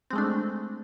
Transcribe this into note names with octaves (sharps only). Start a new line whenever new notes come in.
G#3 A3 C4 D4